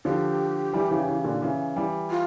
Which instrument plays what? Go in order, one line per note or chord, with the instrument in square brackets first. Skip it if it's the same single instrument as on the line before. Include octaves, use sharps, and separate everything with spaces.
[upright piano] D3 F3 [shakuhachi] G4
[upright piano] E3 G3
C#3 E3
C#3 E3
A#2 D3
C#3 E3
E3 G3
[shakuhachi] F4